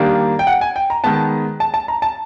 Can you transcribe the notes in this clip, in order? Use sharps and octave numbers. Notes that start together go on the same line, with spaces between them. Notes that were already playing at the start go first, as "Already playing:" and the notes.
Already playing: D#3 G3 A#3 D4
G5
F#5
G#5
G5
A#5
D#3 G#3 B3 A5
A5
A5
A#5
A5